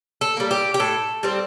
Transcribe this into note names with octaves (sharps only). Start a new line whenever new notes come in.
A4
G3 A#3
G4
G4
A2 A4
G3 C4